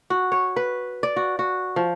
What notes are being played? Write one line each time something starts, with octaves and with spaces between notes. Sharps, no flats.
F#4
C#5
B4
D5
F#4
F#4
F3